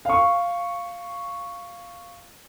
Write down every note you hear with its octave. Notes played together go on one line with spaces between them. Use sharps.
F5 C#6